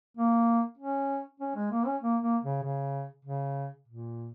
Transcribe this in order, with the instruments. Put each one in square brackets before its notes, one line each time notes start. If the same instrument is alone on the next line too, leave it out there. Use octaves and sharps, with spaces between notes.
[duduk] A#3
C#4
C#4
G#3
A#3
C#4
A#3
A#3
C#3
C#3
C#3
A#2